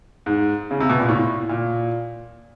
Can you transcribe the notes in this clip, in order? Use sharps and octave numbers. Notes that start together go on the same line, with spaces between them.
G#2
C#3
C3
B2
A#2
A2
A#2